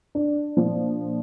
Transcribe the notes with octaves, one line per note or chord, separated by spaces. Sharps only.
D4
A#2 F3